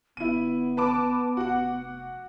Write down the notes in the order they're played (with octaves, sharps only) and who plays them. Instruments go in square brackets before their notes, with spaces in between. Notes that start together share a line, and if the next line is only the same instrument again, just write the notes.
[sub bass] G1 [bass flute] B3 [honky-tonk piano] E4 D#7
[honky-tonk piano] B4 A5 D6
[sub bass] F1 [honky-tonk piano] F#4 F#5